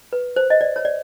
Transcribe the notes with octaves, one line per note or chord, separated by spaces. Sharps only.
B4
C5
D#5
D5
C#5
D5